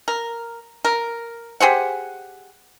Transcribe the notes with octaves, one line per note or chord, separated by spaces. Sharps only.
A#4
A#4
G4 G#4 C5 F#5